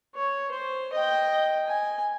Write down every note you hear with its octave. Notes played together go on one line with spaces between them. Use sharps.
C#5
C5
D#5 G5
G#5